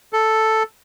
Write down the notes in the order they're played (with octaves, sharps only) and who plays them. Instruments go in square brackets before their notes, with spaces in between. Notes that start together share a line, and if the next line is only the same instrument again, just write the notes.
[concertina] A4